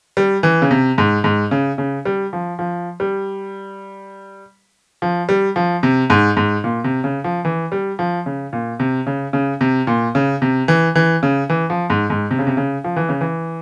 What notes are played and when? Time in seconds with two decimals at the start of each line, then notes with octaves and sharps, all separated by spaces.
0.17 G3
0.43 E3
0.62 C#3
0.71 C3
0.98 G#2
1.24 G#2
1.51 C#3
1.78 C#3
2.05 G3
2.33 F3
2.59 F3
3.00 G3
5.02 F3
5.29 G3
5.56 F3
5.83 C3
6.10 G#2
6.37 G#2
6.64 A#2
6.84 C3
7.04 C#3
7.24 F3
7.45 E3
7.72 G3
7.99 F3
8.26 C#3
8.53 A#2
8.80 C3
9.07 C#3
9.33 C#3
9.61 C3
9.87 A#2
10.15 C#3
10.42 C3
10.68 E3
10.96 E3
11.23 C#3
11.50 E3
11.70 F3
11.90 G#2
12.10 G#2
12.31 C3
12.39 C#3
12.47 C3
12.57 C#3
12.84 F3
12.96 E3
13.09 C#3
13.21 E3